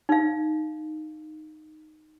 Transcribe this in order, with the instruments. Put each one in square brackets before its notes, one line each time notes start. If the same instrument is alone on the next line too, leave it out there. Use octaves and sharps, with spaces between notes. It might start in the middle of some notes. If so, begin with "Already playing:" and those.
[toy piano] D#4 F5